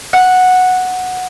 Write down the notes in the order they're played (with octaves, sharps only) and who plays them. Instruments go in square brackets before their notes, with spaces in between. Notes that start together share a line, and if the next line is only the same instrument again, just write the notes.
[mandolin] F#5